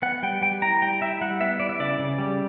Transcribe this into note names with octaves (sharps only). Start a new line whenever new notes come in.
B3 F#5
G3 G5
G3 G5
E4 A#5
G3 G5
E4 E5
G3 F#5
B3 E5
E4 D5
E5
C#3 D5
C#3
G3